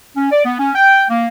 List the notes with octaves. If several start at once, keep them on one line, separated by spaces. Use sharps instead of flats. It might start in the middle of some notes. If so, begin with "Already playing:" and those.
C#4
D5
B3
C#4
G5
A#3